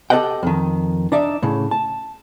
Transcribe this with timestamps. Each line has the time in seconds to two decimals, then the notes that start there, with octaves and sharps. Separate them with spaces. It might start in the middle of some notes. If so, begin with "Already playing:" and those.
0.10 G4 A4 C#5 D#5 F#5 G5
0.43 F2 D#3
1.12 D4 D#4 D5 E5
1.42 A2 C#3
1.71 A5